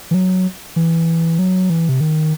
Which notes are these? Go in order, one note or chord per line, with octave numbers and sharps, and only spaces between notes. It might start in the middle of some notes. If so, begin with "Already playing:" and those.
E3
F#3
E3
F#3
E3
C3
D#3